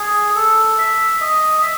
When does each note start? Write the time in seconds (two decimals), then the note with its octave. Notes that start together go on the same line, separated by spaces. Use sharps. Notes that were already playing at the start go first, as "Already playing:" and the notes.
Already playing: G#4
0.35 A4
0.78 E5
1.21 D#5
1.62 E5